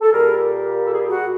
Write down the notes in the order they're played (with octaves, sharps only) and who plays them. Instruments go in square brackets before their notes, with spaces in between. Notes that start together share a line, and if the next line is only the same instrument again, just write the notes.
[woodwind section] A4
A#2 G3 A#3 G#4 A#4
A4
G#4
G4
F#4 G#4